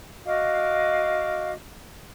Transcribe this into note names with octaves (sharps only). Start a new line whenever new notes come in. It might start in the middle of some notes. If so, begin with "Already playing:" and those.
F#4 D#5 F5 D6